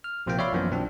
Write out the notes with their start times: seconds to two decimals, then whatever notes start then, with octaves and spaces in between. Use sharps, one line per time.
0.04 F6
0.26 A#1 C3 F3 A#3 G4 G5
0.39 C#5 D5 E5 F5 B5 C6
0.52 F#2 E3 F3 A#3 B3
0.71 B1 C4 D4